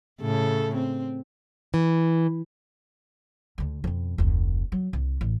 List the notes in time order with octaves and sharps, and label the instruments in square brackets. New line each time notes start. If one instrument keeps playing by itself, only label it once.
[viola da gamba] A2 C#3 A4
C4
[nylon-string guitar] E3
[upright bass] D2 D3
F2 B2
F1 D2
F#3
C2
A1